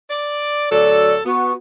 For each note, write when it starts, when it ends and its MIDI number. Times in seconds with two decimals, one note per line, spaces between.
0.10 0.70 74
0.71 1.20 38
0.71 1.20 54
0.71 1.20 69
0.71 1.14 74
1.25 1.53 59
1.25 1.52 66